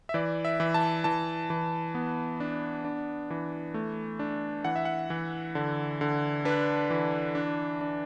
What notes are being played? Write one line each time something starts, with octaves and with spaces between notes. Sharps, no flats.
E5
E3 D5
E5
E3
A5
E3 A5
E3
B3
D4
D4
E3
A3
D4
E3 F#5
E5
F#5
E3
D3
D3
D4 B4
E3
D4
D4